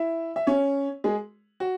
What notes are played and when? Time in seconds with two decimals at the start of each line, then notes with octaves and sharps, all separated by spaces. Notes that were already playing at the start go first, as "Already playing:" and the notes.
Already playing: E4 E5
0.36 E5
0.47 C#4 C#5
1.04 G#3 G#4
1.60 F#4